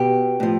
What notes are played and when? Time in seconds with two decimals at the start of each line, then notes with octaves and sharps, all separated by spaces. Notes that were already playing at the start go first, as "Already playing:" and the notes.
Already playing: B2 G4
0.40 A2 F3